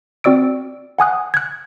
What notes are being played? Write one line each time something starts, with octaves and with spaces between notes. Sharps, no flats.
C4 F#4 D5 E6 D7
F#5 G#5 D#6 F#6
F#6 G#6